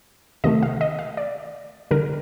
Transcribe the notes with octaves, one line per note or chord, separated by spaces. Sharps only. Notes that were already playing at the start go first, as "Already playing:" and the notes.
C3 D#3 A3 D#5
F5
D#5
F5
D5
D3 G3 A#4